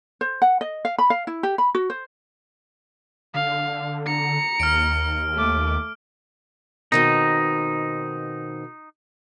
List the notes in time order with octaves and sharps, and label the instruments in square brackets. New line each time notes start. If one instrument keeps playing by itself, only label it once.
[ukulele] C5
F#5
D#5
F5
B5
F5
E4
G4
B5
F#4
C5
[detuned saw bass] D3 [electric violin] F5
[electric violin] A#5 C#7
[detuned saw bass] D#2 [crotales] F6 D7
[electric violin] A3 D6
[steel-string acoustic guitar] B2 D#3 C4 [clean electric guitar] D#4